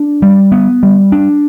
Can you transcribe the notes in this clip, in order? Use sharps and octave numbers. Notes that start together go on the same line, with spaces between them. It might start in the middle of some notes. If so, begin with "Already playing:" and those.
Already playing: D4
G3
B3
G3
D4